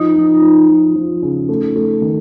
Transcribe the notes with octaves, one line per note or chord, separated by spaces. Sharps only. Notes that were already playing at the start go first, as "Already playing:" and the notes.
Already playing: F3 D#4
F3
F3
F3
F3
C#3
A3
A3
D#3